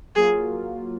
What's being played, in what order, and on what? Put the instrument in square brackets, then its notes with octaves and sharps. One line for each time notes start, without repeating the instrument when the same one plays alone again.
[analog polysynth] F#3 A#3 F4 [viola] G#4